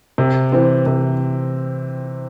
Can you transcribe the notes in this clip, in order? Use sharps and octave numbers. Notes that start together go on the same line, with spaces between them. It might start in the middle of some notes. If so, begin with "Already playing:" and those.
C3
E3 C4
C3